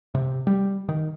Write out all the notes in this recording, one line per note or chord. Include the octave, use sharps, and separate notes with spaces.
C3
G3
D#3